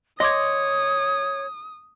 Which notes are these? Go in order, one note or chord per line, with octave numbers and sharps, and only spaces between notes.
C#5 D#5 C6 D6 D#6 G#6